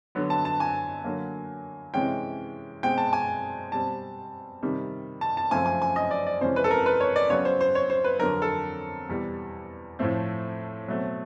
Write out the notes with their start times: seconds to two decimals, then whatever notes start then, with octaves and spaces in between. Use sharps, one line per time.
0.15 D3 F#3 B3
0.30 A5
0.45 A5
0.60 G#5
1.04 D3 F#3 A#3
1.94 C3 E3 G#3 C#4 G5
2.83 B2 G#3 C4 G5
2.98 A5
3.13 G#5
3.72 B2 G3 C4 A5
4.63 C3 D#3 G3
5.21 A5
5.37 A5
5.51 F#2 C#3 F3 A3 C4 G#5
5.66 G#5
5.82 G#5
5.96 D#5
6.11 D5
6.26 D5
6.41 F2 C3 E3 G#3 C#4 C5
6.56 B4
6.64 A4
6.71 A#4
6.86 B4
7.00 C#5
7.16 D5
7.30 C#3 F#3 B3 C#5
7.45 C5
7.61 C5
7.75 C#5
7.90 C5
8.04 B4
8.19 F2 D3 F#3 A#4
8.42 A4
9.09 E2 B2 G3
9.99 A2 F3 A3 C4
10.88 B2 F#3 A3 C4